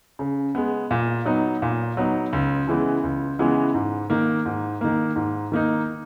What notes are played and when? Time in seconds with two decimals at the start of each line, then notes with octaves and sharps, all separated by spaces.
0.19 C#3
0.55 G#3 B3
0.91 A#2
1.25 F#3 B3 D#4
1.62 A#2
1.97 F#3 B3 D#4
2.33 C#2
2.67 C#3 E3 G#3 B3
3.03 C#2
3.39 C#3 E3 G#3 B3
3.74 G#2
4.10 D#3 A#3
4.45 G#2
4.81 D#3 A#3
5.16 G#2
5.52 D#3 A#3 D#4